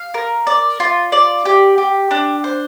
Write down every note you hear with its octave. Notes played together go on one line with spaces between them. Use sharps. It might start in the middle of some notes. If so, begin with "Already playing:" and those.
Already playing: F5
A#4
D5
F4
D5
G4
G4
D4
C5